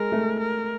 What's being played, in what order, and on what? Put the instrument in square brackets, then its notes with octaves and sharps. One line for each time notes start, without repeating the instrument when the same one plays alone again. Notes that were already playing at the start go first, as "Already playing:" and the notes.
Already playing: [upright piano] G#3 [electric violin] A#4
[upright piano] A3
[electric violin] A#4